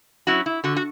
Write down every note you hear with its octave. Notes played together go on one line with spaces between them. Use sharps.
F#3 C#4 E4 F#4
E4
D3 F#4
F#4